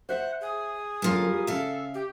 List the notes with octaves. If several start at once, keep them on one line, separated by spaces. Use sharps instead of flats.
C5 E5 F#5
G#4
F#2 D3 A#3 F4 A#4
G3
C#3 A4 E5 F5
G4